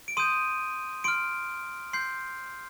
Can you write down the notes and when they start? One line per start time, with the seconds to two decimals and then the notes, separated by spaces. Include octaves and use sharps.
0.08 D7
0.17 C6 D#6 G6 D#7
1.04 C6 F6 D7
1.93 C6 G6 C7